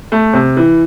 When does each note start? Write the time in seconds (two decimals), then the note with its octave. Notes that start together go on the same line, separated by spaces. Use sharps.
0.12 A3
0.33 C3
0.57 E3